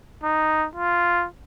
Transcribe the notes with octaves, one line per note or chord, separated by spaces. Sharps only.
D#4
F4